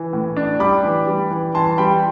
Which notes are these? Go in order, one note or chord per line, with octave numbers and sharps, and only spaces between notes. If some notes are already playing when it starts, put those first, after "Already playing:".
Already playing: E3
A2
D4
G3 B5 D6
E3
G3
E3
E3 A5 C6
G3 G5 B5